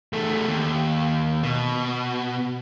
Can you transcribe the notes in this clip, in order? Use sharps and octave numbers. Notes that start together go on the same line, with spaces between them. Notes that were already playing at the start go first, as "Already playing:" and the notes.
E2 A3
D#2
B2